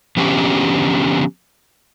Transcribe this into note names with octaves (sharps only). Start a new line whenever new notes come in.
D3 F3 B3 C#4 G4